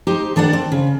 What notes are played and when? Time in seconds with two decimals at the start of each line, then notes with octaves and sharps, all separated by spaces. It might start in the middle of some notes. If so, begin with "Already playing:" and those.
0.07 D#4 G4 C5
0.36 D#3 D4 D5 F#5
0.53 C4
0.72 C#3